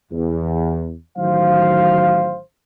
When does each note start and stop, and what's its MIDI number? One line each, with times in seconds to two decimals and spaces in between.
0.12 0.93 40
1.18 2.38 33
1.18 2.38 51
1.18 2.38 54
1.18 2.38 72
1.18 2.38 77